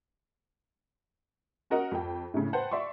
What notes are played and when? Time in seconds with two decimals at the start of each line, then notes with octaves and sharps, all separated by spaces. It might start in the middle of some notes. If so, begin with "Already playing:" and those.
1.70 C#4 F#4 A#4 D#5 F#5
1.92 F2 G5
2.34 A2 C#3
2.53 B4 C5 F#5 G5 A5
2.71 D5 E5 C6 C#6